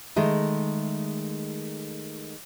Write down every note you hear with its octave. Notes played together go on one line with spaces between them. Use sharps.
D#3 G#3 A3